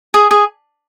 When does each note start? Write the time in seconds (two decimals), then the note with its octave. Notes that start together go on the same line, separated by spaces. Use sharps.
0.14 G#4
0.31 G#4